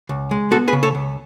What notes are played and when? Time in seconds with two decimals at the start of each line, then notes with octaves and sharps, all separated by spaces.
0.09 C#2
0.31 G#3
0.51 B3 F#4 A4
0.68 G#4 B4
0.73 C#3
0.83 A4 C#5
0.95 C#2